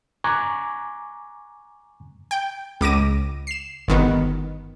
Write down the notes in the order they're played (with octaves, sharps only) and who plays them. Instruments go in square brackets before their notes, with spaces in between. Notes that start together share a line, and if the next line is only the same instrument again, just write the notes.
[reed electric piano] G#5 A#5 C#6 D6 F#6 G#6
[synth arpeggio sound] G5
C#2 D6 A#6 D#7
C7 E7
G1 D#3 B3